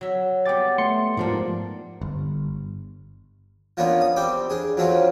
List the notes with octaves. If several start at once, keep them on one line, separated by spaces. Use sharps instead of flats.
F#3 E5
G3 B3 G5 D6 A6
A3 C6 C#7
G#2 F3 A#3 D4 D5
G1
F3 A#3 B3 C#4 D4
D#6
G3 C4 G5 D6
D4 G#4
F2 F3 F#3 C#4 D4